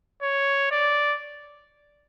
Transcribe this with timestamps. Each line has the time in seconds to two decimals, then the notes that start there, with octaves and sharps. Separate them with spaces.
0.22 C#5
0.71 D5